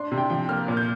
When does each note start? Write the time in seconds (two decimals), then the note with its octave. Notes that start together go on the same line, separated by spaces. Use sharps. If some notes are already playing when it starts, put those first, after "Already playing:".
Already playing: D4 C6
0.12 C3
0.18 G5
0.30 F3 G5
0.49 A#3 F6
0.68 A#2
0.77 G6